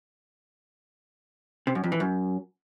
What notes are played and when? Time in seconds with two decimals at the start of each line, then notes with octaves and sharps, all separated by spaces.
1.67 C3
1.75 F#2
1.84 F2
1.92 E3
2.00 F#2